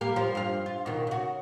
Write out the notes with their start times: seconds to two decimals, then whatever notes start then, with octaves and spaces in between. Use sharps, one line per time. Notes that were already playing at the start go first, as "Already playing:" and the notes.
0.01 G3 A#3 A#4
0.16 F3 G3
0.35 G2 F5
0.66 F4
0.86 B2 D#3
1.07 C#3 F#4